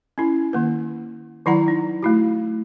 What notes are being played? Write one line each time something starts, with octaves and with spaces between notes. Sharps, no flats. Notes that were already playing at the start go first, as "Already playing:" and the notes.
C#4 E4
D#3 A#3 B4
D#3 F#3 E4 D5 F#5 A#5
D#4
A3 E4 F#4